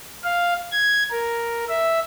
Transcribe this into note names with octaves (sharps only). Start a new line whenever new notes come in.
F5
G#6
A#4
E5